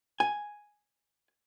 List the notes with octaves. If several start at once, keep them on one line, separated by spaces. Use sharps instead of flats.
G#5